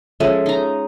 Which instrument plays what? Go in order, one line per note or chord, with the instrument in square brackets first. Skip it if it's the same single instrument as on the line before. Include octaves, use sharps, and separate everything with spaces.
[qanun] F3 G#3 C#4 [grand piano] A4 E5
[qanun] D#4 A#5